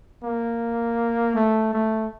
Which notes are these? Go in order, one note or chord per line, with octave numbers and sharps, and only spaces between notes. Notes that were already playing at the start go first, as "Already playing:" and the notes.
A#3
A3
A3